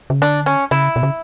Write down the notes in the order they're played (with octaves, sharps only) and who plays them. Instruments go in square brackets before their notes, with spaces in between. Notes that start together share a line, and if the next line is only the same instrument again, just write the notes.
[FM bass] C#3
[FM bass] D3 [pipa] D4
[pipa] C#4
[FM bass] C#3 [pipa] E4
[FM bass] B2
C#3